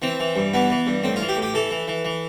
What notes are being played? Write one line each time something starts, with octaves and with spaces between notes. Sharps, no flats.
E3 C4
E3
G2
E3 B3
E3
G2
A2 C4
F4
E3
G4
A2
G4
E3 A4
E3
E3
E3